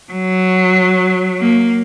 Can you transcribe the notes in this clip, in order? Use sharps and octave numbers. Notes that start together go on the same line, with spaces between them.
F#3
A#3